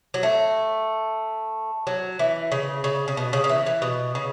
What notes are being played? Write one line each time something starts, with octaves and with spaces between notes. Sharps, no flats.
F#3
A3
F#3
E3
C#3
C#3
C#3
B2
C#3
C#3
E3
E3
B2
C#3